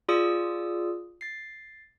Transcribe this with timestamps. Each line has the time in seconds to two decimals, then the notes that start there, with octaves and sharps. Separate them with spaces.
0.09 F4 G#4 D5 D#6 E6
1.21 A6 C7